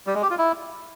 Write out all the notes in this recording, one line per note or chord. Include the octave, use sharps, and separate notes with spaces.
G3
G#3
G4
F4
E4